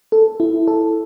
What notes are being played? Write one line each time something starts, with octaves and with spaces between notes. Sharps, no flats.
A4
E4
A4